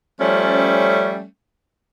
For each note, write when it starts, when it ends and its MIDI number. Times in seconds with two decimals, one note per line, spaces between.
0.20 1.24 53
0.20 1.24 55
0.20 1.24 57
0.20 1.24 61